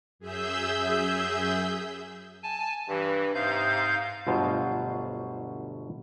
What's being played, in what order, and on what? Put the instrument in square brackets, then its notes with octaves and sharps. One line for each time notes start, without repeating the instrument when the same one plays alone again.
[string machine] F#2 G#4 E5 E6 G6
[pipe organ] G#5 A5
[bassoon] G2 [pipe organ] E3
[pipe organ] G#2 F5 G6 [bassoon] C3
[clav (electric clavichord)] G1 D2 B2 F#3 F4 C5